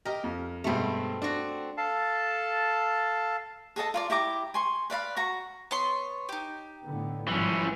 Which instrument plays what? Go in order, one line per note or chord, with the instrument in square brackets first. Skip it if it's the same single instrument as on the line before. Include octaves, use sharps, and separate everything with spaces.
[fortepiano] G4 D#5 G5 [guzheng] A#4
[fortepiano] F2
[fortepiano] G2 B2 G#3 [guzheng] A3 C4
[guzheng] C4 F#4 [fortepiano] D4
[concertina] A4 F5 A5
[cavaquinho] G#4 A4 D#5 A5
F4 A#4 D5
E4 G4 A#5 D6
G#5 C6 C#6
B4 D5 F5 B5
F#4 A#5 C#6
[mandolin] B3 C#5 C6
D#4 G4
[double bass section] A2 D3 B3
[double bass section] G#1 F3 G3 [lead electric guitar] E3 C#4